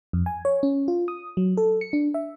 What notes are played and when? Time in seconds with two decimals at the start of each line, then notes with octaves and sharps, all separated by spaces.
0.13 F2
0.26 G#5
0.45 C#5
0.63 C#4
0.88 F4
1.08 D#6
1.37 F#3
1.57 A4
1.81 C#7
1.93 D4
2.14 E5